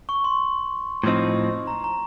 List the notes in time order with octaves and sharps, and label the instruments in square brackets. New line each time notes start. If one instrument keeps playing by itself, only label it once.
[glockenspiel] C#6
C6
[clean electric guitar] A2 F3 C4 D#4
[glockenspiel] A#5
A#5